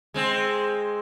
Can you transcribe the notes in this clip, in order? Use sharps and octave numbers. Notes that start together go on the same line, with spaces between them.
G#3 C4